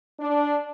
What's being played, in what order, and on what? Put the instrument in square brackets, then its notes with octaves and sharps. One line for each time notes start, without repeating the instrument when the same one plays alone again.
[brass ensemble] D4